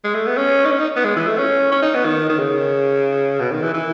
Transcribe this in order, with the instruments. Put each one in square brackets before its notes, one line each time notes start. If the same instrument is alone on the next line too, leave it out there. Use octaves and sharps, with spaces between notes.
[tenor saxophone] G#3
A3
B3
C#4
D#4
C#4
D#4
B3
G#3
E3
A3
C#4
C#4
D#4
B3
D#3
D#3
C#3
B2
D#3
E3
E3